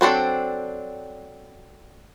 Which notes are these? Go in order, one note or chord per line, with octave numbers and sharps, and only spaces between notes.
F#3 C4 D4 A4